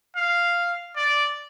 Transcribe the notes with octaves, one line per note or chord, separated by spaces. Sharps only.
F5
D5